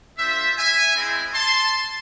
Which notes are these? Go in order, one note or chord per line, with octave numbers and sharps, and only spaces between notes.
G#3 D4 F4 C5 E5
E5 G#5
G#3 C4 E4
A5 C6